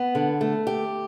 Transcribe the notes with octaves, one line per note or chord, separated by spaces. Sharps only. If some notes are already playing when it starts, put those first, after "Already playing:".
Already playing: B3
D3
A3
G4